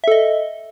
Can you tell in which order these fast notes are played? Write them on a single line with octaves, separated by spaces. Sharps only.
E5 A4 D#5